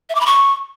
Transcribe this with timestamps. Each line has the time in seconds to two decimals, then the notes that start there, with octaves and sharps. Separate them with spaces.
0.09 E5
0.15 D6
0.21 B5
0.26 C#6